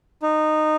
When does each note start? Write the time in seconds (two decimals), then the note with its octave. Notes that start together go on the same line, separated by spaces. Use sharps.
0.23 D#4